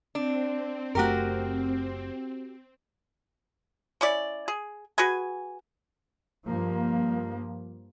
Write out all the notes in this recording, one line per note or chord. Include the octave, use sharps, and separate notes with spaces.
C4 D4
F#1 A3 F#4 G4 A#4
C#4 E4 D5
G#4
F#4 G#4 B4 G#5
G2 F3 A#3